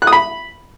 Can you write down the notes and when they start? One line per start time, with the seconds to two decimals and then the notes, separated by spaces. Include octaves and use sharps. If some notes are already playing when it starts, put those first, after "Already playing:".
0.02 F#6
0.07 D#6
0.13 B5